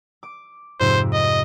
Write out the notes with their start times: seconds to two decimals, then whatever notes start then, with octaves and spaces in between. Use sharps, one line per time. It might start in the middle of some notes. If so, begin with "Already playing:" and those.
0.23 D6
0.80 F2 G#2 C3 C5
1.13 D#5